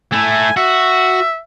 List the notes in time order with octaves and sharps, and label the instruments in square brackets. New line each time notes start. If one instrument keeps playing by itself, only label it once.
[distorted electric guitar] A3 E4 [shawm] G#5
[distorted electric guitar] F#4 [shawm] E5